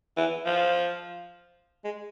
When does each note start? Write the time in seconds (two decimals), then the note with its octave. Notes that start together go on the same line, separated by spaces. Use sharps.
0.17 E3
0.46 F3
1.84 G#3